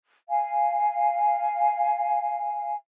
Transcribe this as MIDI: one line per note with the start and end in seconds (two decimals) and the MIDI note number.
0.29 2.75 77
0.29 2.75 80